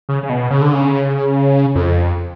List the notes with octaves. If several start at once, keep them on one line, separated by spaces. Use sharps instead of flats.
C#3
C#3
B2
C#3
D3
C#3
F2